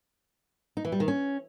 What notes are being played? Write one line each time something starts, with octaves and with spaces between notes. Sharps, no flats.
D#4
E3
G3
D#3
C#4